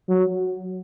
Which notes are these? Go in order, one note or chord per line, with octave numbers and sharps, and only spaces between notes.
F#3